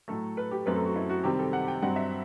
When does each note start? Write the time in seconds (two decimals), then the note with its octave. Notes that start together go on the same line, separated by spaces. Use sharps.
0.08 A2 F#3 A3 A4
0.37 B4
0.51 G4
0.66 F#2 F#3 A3 C4 B4
0.75 A4
0.85 F#4
0.96 E4
1.10 F#4
1.24 C3 D#3 G3 C4 G4
1.39 A4
1.53 F#5
1.68 G5
1.82 G2 F#3 C4 F#5
1.96 E5